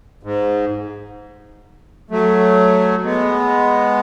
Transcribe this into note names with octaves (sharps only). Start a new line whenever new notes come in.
G#2
F#3 A3
G#3 B3